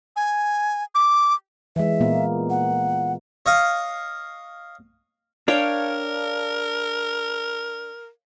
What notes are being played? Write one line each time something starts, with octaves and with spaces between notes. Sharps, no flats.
G#5
D6
E3 G#3 E5
A#2 A#3 B3
F#5
C#5 D#5 F5
D4 A#4 C#5 F5 G5